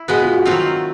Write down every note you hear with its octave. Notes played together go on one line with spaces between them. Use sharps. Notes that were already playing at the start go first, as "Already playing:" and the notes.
Already playing: E4
B2 G#3 B3 F#4
F4
F#4
D#3 F#3 A3 C4 F4